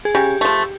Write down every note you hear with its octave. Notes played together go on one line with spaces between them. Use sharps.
G#4
C#3 G4
F3 A3